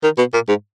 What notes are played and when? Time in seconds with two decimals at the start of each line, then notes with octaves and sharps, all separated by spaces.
0.03 D#3
0.18 B2
0.33 A#2
0.48 G#2